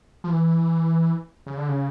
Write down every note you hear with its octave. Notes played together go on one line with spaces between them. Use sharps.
F3
E3
C#3
D3
C#3